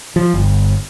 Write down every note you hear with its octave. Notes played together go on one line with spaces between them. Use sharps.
F3
G1